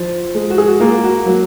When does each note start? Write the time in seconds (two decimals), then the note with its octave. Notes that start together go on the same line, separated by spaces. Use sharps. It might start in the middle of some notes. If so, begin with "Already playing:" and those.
Already playing: F3
0.35 G#3
0.50 F#4
0.58 G#4
0.68 F#4
0.80 A#3 F4
1.04 F#4
1.26 F#3